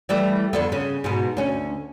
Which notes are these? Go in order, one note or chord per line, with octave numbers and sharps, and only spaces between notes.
E3 G3 A3
F2 D3 B3
C#3
G#2 B2
D2 C#4